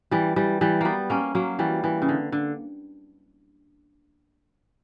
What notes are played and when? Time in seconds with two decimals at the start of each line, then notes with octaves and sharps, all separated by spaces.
0.11 E3 G3
0.36 E3 G3
0.61 E3 G3
0.81 G3 A#3 B3
1.10 A#3 C#4
1.35 F#3 A#3
1.59 E3 G3
1.84 E3
2.02 C#3
2.09 D3
2.32 D3